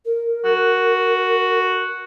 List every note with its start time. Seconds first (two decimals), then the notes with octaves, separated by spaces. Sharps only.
0.05 A#4
0.45 F#4